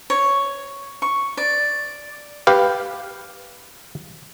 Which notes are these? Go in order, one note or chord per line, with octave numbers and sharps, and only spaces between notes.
C#5
C#6
D5
G4 B4 F5